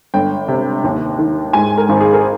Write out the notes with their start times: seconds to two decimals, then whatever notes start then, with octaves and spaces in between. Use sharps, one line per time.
0.14 G1 G5
0.48 C3
0.84 D#2
1.19 D#3
1.53 G#2 G#5
1.78 A#4
1.89 G#1
2.01 G#4
2.13 A#4